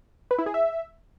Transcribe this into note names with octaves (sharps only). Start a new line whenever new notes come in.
B4
E4
G#4
E5